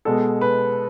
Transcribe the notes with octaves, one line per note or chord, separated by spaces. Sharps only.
B2 G#3 A4
B4